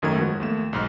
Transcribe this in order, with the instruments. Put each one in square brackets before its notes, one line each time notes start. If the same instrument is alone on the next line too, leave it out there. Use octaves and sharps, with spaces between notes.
[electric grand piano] G#1 F#2 D#3 A3 G#6
F3 F#3 G#3 B3 F#4
D#2 A3 E7
B1 G#2 F6